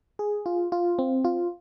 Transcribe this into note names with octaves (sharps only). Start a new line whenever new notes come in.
G#4
F4
F4
C4
F4